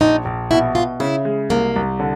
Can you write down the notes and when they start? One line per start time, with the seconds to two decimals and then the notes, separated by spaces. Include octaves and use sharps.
0.01 A#1 D#4
0.25 A#1
0.51 B2 E4
0.75 B2 F4
1.00 C#3 E4
1.25 G#3
1.50 C2 A#3
1.76 C2
2.00 D3